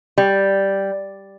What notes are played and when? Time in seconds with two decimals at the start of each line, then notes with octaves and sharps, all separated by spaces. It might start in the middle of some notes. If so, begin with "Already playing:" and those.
0.18 G3